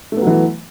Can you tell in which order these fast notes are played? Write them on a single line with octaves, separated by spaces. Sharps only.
A3 B3 F#3 E3